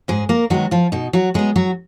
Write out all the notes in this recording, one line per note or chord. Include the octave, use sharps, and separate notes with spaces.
G#2 G#3 G#4
A#3 A#4
D#3 F#3 G#3 B3 F#4
F3 F4
B2 D#4
F#3 F#4
F#3 G#3 B3 G#4
F#3 F#4